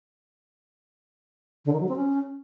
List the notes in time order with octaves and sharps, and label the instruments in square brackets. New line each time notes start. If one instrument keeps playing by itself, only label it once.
[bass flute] D3
D#3
F#3
C4
C#4